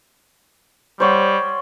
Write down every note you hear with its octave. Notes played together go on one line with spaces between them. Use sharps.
G3 C5 C#5 F#5